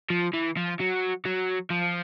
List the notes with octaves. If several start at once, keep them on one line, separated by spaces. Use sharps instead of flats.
F3
E3
F3
F#3
F#3
F3